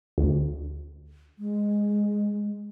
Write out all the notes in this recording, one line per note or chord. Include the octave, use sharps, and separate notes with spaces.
D2
G#3